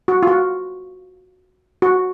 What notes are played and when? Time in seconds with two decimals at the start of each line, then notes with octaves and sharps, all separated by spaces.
0.08 F#4
0.23 F4
0.27 F#4
1.82 F#4